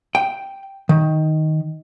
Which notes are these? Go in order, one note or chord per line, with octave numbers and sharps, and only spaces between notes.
G5
D#3